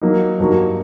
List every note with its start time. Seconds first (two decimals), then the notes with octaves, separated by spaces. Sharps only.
0.02 F#3 A#3 D#4
0.39 G2 F#3 A#3 D#4 F#4